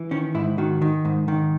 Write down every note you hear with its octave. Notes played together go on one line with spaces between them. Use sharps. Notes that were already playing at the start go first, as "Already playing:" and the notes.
Already playing: E3
D#3 C#4
G#2 E4
D#3 F#4
D#3
G#2
D#3